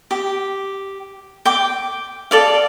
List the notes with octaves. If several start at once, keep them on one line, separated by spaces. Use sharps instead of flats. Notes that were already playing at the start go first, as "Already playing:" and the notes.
G4
G5 D6
A4 D5 F5